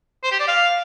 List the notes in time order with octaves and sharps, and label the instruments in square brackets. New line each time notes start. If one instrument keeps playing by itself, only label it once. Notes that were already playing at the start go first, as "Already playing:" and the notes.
[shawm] C5
G4
D5
F5